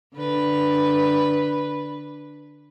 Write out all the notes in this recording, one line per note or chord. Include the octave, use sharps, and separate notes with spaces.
D3 B4